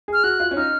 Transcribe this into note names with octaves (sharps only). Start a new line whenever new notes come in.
G#4
F6
F#4 F#6
F4
C#4
D#4 F6